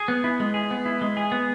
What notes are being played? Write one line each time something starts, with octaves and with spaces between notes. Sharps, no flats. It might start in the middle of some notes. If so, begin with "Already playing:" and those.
Already playing: G#4
B3
E4
G#3
G#4
B3
E4
G#3
G#4
B3